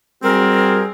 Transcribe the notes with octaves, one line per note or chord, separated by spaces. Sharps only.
G3 C4 F#4 G#4 A#4